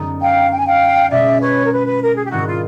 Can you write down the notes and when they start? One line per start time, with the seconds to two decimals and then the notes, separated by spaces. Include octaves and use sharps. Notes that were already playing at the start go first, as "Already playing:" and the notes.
Already playing: F#2 D3 F#3 B3 D#4
0.21 F5 G5
0.51 G5
0.58 G#5
0.66 F5 G5
1.11 B2 G#3 C#4 F4 D5 E5
1.41 B4 C#5
1.66 A#4
1.72 B4
1.87 B4
2.01 A#4
2.16 G#4
2.25 G4
2.31 G#2 D#3 G3 C4 E4 F#4
2.47 F4